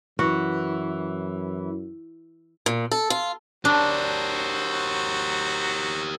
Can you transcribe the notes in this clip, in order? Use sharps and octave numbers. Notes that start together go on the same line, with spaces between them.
F#2 E3 F#4
A#2
A4
F4
F#3 D4 F#4 G4 A#4 C5